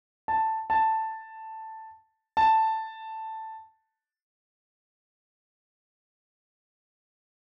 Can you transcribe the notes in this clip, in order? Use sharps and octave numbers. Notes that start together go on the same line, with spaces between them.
A5
A5
A5